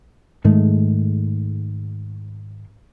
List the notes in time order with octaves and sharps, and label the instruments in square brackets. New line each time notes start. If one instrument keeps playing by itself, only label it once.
[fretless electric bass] G#2 D#3 G#3 A3